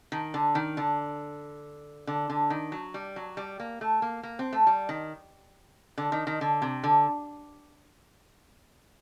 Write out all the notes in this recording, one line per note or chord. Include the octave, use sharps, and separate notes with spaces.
D#3
D3
D#3
D3
D3
D3
D#3
F#3
G3
F#3
G3
A#3
A3
A#3
A#3
C4
A3
G3
D#3
D3
D#3
D#3
D3
C3
D3